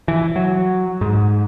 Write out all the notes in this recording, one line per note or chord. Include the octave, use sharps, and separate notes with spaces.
E3
F#3
G#2